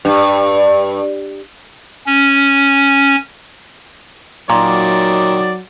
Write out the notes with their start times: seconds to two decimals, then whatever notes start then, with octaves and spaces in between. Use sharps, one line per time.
0.05 G2
2.07 C#4
4.50 A#2 D#3 F#3 D5